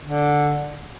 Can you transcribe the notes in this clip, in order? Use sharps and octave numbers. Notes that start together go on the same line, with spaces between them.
D3